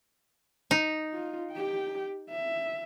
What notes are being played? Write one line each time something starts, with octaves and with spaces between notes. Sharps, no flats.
D#4
F4
G4 G5
E5